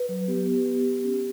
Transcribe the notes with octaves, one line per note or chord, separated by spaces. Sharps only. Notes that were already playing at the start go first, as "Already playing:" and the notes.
Already playing: B4
F#3
B3 G4
B3
B3
B3
C#4